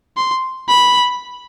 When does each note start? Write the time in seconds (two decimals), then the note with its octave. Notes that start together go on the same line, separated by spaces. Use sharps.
0.17 C6
0.69 B5